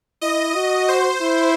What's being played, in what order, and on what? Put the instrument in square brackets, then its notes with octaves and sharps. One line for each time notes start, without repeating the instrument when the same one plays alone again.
[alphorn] E4 [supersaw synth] D#5
[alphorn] F#4
[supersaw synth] C5
[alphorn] E4